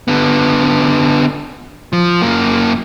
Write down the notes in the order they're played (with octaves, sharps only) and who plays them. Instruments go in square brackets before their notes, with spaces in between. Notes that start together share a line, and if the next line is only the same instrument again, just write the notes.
[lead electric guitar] D3 B3
F3
F#2 A#3